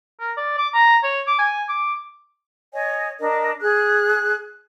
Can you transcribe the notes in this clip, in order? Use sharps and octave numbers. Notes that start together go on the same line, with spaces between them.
A#4
D5
D6
A#5
C#5
D6
G#5
D6
C#5 D#5 G#5
D4 A#4 D#5
G#4 F#6